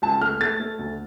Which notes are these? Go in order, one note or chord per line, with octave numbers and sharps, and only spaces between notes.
C#2 A5
A3 F6
A3 A6
A3
D2